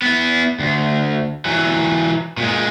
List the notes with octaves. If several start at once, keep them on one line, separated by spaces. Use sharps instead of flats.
B3 E4
D2
E3 F#3
A#2 G#3